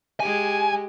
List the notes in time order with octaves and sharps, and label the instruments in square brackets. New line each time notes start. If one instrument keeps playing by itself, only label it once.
[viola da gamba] G#3 G4 [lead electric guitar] G#5